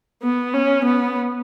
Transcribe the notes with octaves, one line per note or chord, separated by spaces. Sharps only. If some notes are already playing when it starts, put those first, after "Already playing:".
B3
C#4
B3